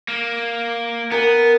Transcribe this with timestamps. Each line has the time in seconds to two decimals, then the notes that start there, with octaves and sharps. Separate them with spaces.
0.08 A#3
1.12 B3 A#4 G#5